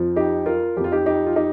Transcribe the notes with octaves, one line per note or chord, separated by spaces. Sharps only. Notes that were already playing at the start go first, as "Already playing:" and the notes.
Already playing: F2 F3
D#4 G4
F4 A#4
F2 F3 F4 G4
D#4 G4
D#4 G4
F4
D#4 G4